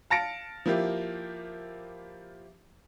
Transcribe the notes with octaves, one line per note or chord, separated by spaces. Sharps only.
F5 A5 A#6 C#7 D7
F3 A#3 E4 F4 G4